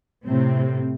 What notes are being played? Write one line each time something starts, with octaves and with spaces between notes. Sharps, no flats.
A2 C3 C4